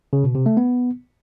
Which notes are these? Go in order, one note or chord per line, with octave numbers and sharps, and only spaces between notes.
C#3
B2
C3
A3
B3